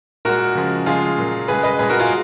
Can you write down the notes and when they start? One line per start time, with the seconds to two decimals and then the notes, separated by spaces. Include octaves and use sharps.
0.25 A#2 G#3 F#4 A#4
0.55 C#3 F3 G#3
0.86 C#3 F3 G#3 F4 G#4
1.18 A#2 F#3
1.48 C#3 G#3 G#4 B4
1.63 B4 D#5
1.79 A#2 G#3 G#4 B4
1.89 F#4 A#4
1.99 F4 G#4